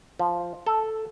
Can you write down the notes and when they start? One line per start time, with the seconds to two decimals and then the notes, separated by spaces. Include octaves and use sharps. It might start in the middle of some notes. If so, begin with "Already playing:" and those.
0.19 F3
0.67 A4